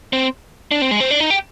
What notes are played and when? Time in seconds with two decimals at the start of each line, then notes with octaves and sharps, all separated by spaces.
0.13 C4
0.71 D4
0.82 C4
0.91 G#3
1.00 C4
1.11 D4
1.20 D#4
1.30 G4